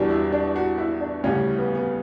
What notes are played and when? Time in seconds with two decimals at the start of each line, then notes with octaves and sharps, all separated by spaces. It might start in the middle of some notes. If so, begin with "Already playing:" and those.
Already playing: E2 B2 G3 D4
0.10 E4
0.32 D4
0.56 F#4
0.78 E4
1.01 D4
1.24 D2 C#3 G3 C#4
1.58 B3
1.75 B3